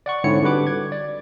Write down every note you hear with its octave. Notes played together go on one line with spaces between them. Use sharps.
D5 F#5 C#6
G#2 D3 C4 E4 C#5 C#7
D3 G3 F#4 B4 D6
G#6
D5